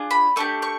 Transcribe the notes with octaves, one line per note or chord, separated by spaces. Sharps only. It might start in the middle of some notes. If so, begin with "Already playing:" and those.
Already playing: D4 F4 G#4
B5
A3 D4 G4 C#6
C#6